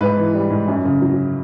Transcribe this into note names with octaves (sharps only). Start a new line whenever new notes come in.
G#2 B4
E3
G3
G#2
F#2
C#3
F#3